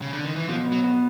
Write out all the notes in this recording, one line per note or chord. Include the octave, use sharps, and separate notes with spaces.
C#3
D3
D#3
E3
B2 F3
B3
F#3
B3